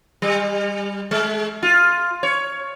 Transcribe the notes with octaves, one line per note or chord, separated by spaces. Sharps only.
G3
G#3
F4
C#5